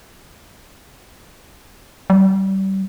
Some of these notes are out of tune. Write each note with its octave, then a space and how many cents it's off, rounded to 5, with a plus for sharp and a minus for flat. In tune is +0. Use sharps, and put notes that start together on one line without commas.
G3 -30